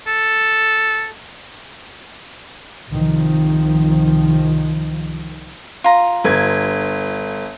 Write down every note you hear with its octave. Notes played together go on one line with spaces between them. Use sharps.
A4
C2 D#3 F3
F4 A#5
G1 G#6